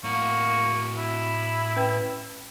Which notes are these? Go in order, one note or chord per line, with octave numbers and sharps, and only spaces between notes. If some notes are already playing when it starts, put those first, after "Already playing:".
A2 A#3 F#4 C#6
E4 B5
C#4 B4 G5